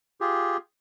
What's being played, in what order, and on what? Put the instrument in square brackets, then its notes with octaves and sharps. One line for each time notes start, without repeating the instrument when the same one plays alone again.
[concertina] F4 G4 G#4